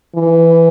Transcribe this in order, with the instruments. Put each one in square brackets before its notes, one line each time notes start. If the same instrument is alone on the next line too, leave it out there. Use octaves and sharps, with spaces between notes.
[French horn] E3